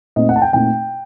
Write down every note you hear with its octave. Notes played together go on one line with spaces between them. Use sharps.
A#2 A3 C4 D#4 D#5
F#5
A5
G5
A#2 A3 C4 D#4 G5